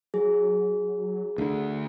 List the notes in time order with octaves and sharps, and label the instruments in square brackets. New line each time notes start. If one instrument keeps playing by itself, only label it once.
[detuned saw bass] F#3 [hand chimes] G#4
[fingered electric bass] D2 D3